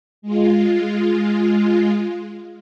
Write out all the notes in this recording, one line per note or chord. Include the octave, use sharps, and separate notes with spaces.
G#3 F4